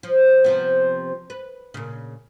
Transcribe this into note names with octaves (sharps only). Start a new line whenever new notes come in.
F3
C3 F3 B3
B4
A#2 C#3